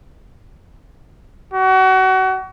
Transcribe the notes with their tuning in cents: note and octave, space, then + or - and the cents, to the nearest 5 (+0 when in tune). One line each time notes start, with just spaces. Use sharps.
F#4 +30